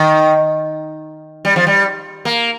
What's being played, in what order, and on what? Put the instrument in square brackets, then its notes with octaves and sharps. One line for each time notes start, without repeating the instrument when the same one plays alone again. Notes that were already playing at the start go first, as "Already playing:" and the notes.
Already playing: [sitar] D#3
G3
F3
G3
A#3